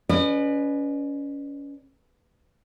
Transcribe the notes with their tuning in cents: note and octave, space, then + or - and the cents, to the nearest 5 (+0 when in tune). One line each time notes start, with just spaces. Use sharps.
C#4 +25 B4 +0 D#5 -45